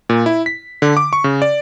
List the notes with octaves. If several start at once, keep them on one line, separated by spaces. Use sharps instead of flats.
A#2
E4
B6
D3
D6
C#6
C#3
D5